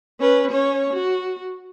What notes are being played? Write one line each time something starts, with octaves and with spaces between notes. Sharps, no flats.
C#4 B4
C#4 C#5
F#4